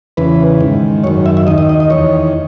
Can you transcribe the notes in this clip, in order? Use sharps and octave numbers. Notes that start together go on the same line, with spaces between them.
E2 C#3 E3 B4
G#2 D#3
F#2 D#3 C#5
E5
E5
D#2 D#3 D#5
D#5
D#5
D#5
E2 D#3 C#5